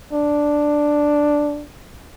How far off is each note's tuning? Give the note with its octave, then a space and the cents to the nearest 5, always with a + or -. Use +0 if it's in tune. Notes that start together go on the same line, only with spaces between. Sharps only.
D4 +0